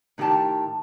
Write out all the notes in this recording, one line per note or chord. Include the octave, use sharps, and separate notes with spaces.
A2 D#3 G4 G5 A5